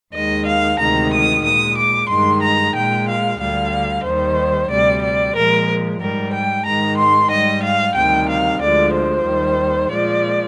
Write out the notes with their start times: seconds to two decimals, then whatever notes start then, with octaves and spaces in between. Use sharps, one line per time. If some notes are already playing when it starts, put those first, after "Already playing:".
0.14 D#2 D#3 G#3 D#5
0.47 F5
0.79 D2 C3 D#3 G#3 A#5
1.12 D#6
1.45 A#2 G#3 D#6
1.78 D6
2.10 G2 D#3 G#3 C6
2.42 A#5
2.75 A#2 G#3 G5
3.08 F5
3.40 D2 D3 G3 F5
4.05 D#2 D#3 G3 C5
4.70 D2 C3 G3 D5
5.03 D5
5.36 A#2 F3 G#3 A#4
6.01 G#2 G3 A#4
6.33 G5
6.66 G#2 D#3 G#3 A#5
6.99 C6
7.31 G#2 G3 D#5
7.64 F5
7.96 D2 C3 D#3 G3 G5
8.30 F5
8.61 D2 D3 F3 G#3 D5
8.94 C5
9.27 D#2 D#3 G3
9.92 A#2 F3 G#3 D5